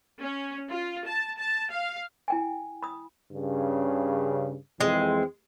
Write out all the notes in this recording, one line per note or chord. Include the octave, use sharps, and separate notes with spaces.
C#4
F4
A5
A5
F5
E4 G5 G#5
B5 D#6
G2 C#3
F2 E3 G#3 C4